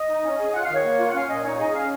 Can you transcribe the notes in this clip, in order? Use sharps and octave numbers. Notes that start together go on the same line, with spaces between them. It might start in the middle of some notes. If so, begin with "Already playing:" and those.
Already playing: D#5
D#4
C#4
G#4
F4 F#5
F5
D#3
C#5
A#3
F4
F#5
C#4 F5
A#2 D#5
D#4 C#5
G#4 D#5
C#4 F5